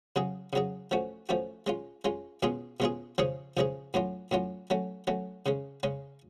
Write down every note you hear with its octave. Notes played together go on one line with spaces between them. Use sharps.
C#3 F#3 C#4 G#4
C#3 F#3 C#4 G#4
F3 A3 C#4 F#4
F3 A3 C#4 F#4
G#3 C#4 F4
G#3 C#4 F4
B2 G#3 C#4 F4 G#4
B2 G#3 C#4 F4 G#4
C#3 F3 G#3 C#4 G#4
C#3 F3 G#3 C#4 G#4
A2 F#3 C#4 F4
A2 F#3 C#4 F4
F#3 A3 C#4
F#3 A3 C#4
C#3 G#3 C#4
C#3 G#3 C#4